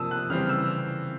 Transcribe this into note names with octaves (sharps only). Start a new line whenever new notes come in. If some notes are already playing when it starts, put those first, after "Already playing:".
Already playing: C3 F3 A#3 A5 D#6 E6
F#6
C#3 E3 G3 C4 F6
E6